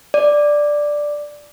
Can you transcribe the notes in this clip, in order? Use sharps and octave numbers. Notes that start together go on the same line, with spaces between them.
D5